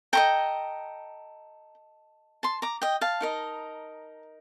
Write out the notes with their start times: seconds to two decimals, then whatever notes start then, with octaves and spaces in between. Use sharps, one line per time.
0.13 A4 C5 D#5 G5 A#5
2.43 A5 C6
2.62 A#5 D6
2.82 D#5 G5
3.01 F5 A5
3.21 D#4 A#4 D#5